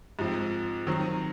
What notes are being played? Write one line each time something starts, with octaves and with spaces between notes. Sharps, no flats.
G#2 F3 C4
D#3 F#3 C4